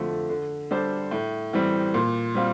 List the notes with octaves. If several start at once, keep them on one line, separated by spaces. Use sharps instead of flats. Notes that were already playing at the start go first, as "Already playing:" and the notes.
Already playing: F2 D3 F3 A3
D3
G3 D4 A4 C5
A2
E3 G3 C4
A#2
G3 C4 F4